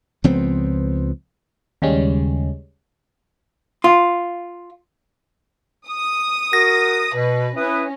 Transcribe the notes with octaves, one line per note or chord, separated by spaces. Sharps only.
C#2 F3 B3 C4
D#2 C#3 G3 G#3 C#4
F4
D#6
F#4 A#4 A#6
B2 B4
C#4 E4 B4 D#6